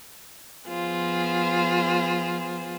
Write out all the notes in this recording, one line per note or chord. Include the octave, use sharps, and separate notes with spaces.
F3 B3 F4 G#4 C5